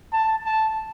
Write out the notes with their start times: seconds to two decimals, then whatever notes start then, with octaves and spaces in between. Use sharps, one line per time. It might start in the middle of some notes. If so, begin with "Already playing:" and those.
0.13 A5
0.45 A5